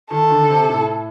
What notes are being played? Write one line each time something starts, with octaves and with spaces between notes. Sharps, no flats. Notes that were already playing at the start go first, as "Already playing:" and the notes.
D#3 A4
D3
C3
A2